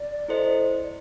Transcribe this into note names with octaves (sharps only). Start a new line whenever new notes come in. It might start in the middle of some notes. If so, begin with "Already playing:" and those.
Already playing: D5
E4 A4 C5 D#5